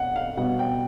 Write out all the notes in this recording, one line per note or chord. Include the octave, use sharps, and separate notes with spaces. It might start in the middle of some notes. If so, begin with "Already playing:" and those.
Already playing: B2 F#5
F5
B2 G3 B3 F#5
G5